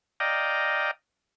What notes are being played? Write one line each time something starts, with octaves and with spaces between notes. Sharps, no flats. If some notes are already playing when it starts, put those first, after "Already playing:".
D5 D#5 F5 G5 A#5